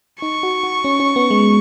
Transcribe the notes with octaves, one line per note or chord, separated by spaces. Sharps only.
D#4 C#6
F#4
F#4
C#4
C#4
B3
G#3